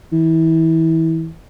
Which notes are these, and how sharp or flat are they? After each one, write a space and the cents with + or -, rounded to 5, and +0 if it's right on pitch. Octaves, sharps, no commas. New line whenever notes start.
E3 -30